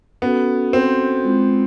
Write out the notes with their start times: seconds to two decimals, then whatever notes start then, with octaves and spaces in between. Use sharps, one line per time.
0.22 B3 C#4 F#4 A4
0.73 C4
1.25 G#3 C4 F4